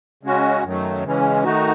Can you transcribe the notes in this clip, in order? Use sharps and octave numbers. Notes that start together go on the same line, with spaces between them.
C#3 G#3 C#4 F#4
F#2 D#3 F#3 A3
C#3 E3 G#3 C#4
D#3 A3 D#4 F#4